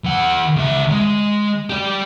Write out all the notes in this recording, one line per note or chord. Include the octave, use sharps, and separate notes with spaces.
E3 F#5
C#2 E5
G#3
G4 D5